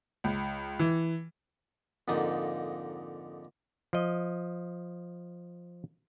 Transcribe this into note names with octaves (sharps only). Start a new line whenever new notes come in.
C#2
E3
F2 G#2 D3 A#3 D#4
F3 D#5